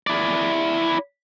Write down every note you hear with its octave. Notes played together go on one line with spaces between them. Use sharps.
E4 D5